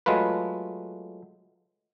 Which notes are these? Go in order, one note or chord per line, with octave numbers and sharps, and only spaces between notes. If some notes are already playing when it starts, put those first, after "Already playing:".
F#3 G#3 A3 F4 B4